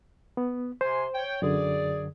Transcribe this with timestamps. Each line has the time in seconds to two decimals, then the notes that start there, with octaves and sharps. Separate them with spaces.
0.37 B3
0.81 C3 C5 G#5 C6
1.14 C#5 G5
1.42 F#2 D3 G#4 D5